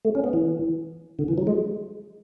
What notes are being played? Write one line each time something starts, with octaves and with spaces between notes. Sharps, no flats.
A3
C#4
B3
E3
D3
E3
F#3
G#3